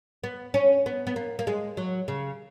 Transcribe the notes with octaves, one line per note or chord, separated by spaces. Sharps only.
B3
C#4
B3
B3
A#3
A#3
G#3
F#3
C#3